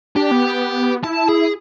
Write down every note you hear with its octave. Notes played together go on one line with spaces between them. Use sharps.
D4 G4
B3
E4 A5
G#4